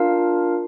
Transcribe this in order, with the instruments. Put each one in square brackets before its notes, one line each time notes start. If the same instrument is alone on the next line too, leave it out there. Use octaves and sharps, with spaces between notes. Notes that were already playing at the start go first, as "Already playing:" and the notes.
Already playing: [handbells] D4 F4 A#4 F5